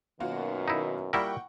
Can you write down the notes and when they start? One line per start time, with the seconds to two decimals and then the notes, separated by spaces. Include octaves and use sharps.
0.20 F#2 B2 D#3 A#3 F4 F#4
0.68 D#4 E4
1.13 A#2 G3 E4 A#4 F#5 G5 C#6